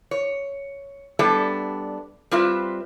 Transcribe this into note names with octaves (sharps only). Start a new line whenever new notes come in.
C#5
G3 B3 D4 A4 E5
G3 C4 F4 B4 E5